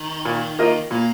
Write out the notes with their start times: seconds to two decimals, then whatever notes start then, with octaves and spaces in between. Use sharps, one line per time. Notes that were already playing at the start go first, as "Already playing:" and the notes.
Already playing: D#3
0.25 A#2
0.59 A#3 F4 A#4 D#5
0.91 A#2 A#3